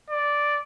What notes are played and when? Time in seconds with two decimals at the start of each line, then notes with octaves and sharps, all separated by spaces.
0.10 D5